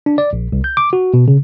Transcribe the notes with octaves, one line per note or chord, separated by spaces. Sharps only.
D4
D5
A#1
C2
G6
D6
F#4
B2
C#3